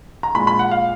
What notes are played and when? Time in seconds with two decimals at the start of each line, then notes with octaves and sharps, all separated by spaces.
0.23 A#5
0.35 A#2 G#3 B5
0.47 B5
0.59 F#5
0.71 F5